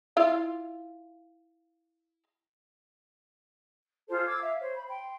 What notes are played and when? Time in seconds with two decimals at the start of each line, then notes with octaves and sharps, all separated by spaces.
0.17 E4 F4 F5
4.08 F4 G#4 A4 C5
4.26 D6 E6 G#6
4.40 E5 F5
4.60 C5 C#5
4.74 B5
4.88 G5 C6